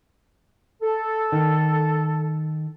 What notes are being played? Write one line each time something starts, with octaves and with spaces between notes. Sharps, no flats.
A4
D#3